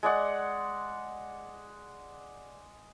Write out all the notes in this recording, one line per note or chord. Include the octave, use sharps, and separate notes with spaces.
G#3 D5 F#5